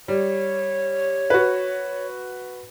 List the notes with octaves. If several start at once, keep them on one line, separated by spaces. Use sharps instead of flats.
G3 C#5
F#4 B4